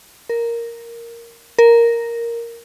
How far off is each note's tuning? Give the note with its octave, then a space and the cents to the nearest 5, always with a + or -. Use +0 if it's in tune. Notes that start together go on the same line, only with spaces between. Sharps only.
A#4 +0
A#4 +0